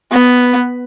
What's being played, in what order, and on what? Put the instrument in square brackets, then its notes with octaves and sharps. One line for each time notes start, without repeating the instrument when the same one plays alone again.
[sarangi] B3